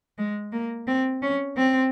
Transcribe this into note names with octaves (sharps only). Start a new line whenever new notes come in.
G#3
A#3
C4
C#4
C4